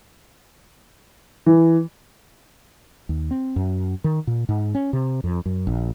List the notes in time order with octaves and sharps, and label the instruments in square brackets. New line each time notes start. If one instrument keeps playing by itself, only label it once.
[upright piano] E3
[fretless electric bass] D#2
C4
F#2
D#3
A#2
G#2
C#4
C3
F2
F#2
A#1